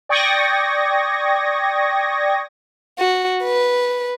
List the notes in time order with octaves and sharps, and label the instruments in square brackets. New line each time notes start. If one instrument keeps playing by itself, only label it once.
[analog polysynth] D5 G5 C#6 D#6 G#6 A#6
[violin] F#4
B4